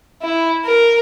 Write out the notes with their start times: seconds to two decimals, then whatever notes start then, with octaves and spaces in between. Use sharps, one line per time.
0.23 E4
0.65 A#4